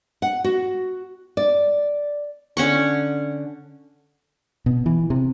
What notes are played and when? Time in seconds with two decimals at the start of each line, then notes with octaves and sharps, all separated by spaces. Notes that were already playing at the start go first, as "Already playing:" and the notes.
0.22 F#5
0.44 F#4
1.37 D5
2.57 D3 C#4 F#5 C#6
4.66 B2
4.86 E3
5.10 C3